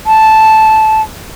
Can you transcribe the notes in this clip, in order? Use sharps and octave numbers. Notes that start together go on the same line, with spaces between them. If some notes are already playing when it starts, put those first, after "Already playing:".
A5